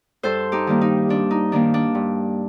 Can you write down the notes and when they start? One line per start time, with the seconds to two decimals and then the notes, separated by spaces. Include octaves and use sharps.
0.23 G2 A4 C5
0.52 D#4 G4
0.67 D#3 G3 A#3
0.81 D#4
1.09 G2 D4
1.31 D#4
1.52 D#3 G3 A#3 D4
1.74 D4
1.95 G2